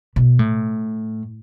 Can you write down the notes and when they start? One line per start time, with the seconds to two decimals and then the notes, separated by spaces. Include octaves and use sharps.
0.16 B2
0.39 A2